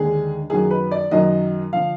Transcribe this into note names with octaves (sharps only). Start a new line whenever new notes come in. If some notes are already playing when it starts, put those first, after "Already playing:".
Already playing: D#2 D3 G#3 G#4
F#2 D#3 F#3 G#4
B4
D5
F#2 D#3 F#3 D#5
D3 F3 F5